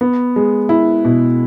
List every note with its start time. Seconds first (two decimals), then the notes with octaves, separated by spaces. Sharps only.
0.01 B3
0.36 G#3
0.69 E4
1.05 B2